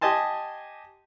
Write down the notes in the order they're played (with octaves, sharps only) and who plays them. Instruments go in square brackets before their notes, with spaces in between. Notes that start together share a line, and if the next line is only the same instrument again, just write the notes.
[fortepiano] G4 D#5 G#5 A5 C6